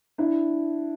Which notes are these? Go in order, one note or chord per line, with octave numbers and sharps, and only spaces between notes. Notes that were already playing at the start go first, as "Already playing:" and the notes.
D4 E4